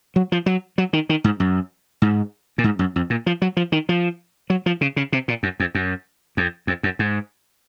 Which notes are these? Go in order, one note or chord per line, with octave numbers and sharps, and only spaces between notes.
F#3
F3
F#3
F#3
D#3
D#3
G#2
F#2
G#2
A#2
G#2
F#2
F2
A#2
F3
F#3
F3
D#3
F3
F#3
F3
C#3
C#3
C3
A#2
F#2
F2
F#2
F2
F2
F#2
G#2